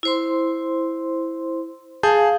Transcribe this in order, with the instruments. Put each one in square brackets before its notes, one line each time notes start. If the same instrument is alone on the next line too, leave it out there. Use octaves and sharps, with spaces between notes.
[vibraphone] E4 C5 C6
[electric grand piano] G#4 A5 G6 [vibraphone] F5